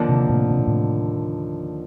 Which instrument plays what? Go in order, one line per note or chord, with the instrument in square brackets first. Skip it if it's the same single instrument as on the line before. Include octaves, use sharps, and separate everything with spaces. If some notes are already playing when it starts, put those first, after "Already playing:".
Already playing: [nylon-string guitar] D#2 D3 F3 A#3 D4
[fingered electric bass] C3 D#3
A2 C3
C3
A#2
A2 C3